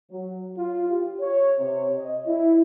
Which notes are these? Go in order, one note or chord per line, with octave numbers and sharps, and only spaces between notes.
F#3
F4
G4
C#5
C3
D#5
E4